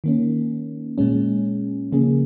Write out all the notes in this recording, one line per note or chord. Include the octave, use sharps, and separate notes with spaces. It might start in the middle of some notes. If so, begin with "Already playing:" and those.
D#3 A#3 C#4
A#2 G#3 C#4
C#3 F3 A#3 C#4 G#4